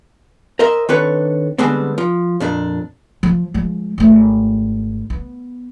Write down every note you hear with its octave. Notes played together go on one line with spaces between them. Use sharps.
A#4 C5 D#5 E5
D#3 C4 D4 A4 B4 C#5
D3 G3 G#3 B3 C4 D4
F3
F2 A#2 D4
F3
F3 G#3
G#1 A3
B3